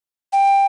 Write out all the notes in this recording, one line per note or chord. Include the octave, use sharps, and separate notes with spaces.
G5